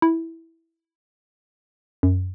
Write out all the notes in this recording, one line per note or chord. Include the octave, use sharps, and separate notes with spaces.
E4
F#2